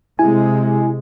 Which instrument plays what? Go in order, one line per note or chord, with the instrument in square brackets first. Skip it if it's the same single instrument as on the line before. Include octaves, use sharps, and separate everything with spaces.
[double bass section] C3 G#3 [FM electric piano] E4 G#5